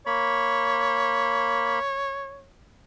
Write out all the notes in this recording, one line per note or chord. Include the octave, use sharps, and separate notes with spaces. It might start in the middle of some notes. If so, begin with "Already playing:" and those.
A#3 C#5 B5